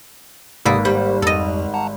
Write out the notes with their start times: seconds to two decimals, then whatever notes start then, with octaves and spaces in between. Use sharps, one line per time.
0.65 G#1 C3 A#3 G4 A4 B4 D#6
0.85 G3 C5
1.22 F2 A4 D#5
1.74 F#5 A5 A#5